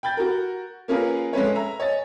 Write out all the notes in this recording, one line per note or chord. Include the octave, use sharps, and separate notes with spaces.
G5 B5 G6 A6
F#4 A#4
A#3 C#4 F4 G#4 A#4 B4
G#3 A3 C#4 B4 C#5
E5 A#5
C#5 D#5 G#5 A6